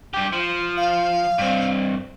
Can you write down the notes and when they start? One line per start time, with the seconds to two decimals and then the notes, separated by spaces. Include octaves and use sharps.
0.14 G2 G4
0.33 F3
0.77 F5
1.38 G2 C4